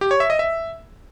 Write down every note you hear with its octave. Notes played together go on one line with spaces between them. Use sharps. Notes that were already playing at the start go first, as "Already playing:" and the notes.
G4
C#5
E5
D#5
E5